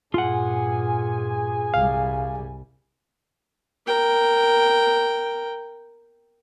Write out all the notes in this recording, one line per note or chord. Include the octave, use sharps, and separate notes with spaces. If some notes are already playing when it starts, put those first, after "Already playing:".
G2 A#2 F4 G#4 F#5 G#5
C2 G3 F5
A#4 G5